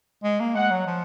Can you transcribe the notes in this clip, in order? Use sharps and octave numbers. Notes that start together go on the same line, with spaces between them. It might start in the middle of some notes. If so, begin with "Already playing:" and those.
G#3
A#3
G#3 F#5
F#3
F3